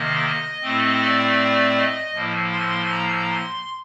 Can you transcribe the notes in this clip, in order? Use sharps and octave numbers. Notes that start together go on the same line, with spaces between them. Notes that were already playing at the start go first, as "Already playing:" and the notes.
Already playing: C3 D#3 A#3 D#5
A2 A3 C4
D5
D#5
A2 F3 A#3
C6
A#5
C6